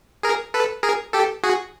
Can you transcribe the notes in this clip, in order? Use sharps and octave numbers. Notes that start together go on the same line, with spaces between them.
G#4 A#4
A4 B4
G#4 A#4
G4 A4
F#4 G#4